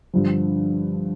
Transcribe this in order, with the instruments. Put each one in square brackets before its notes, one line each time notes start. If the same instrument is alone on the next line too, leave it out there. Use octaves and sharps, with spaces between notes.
[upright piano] G2 D3 F3